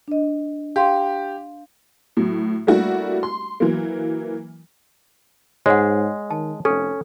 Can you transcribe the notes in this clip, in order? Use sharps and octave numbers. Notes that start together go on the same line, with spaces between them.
D4 D#5
G4 F5 C6
A2 F#3
G3 A3 A#3 D4 E4 F#4
C6
E3 F#3 A#3
G#2 G#3 C#5 F#5
D#3 A5
F1 C#4 A4